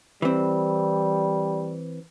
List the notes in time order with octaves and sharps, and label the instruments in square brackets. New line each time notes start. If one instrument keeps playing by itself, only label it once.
[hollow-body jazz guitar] E3 C4 [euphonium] G3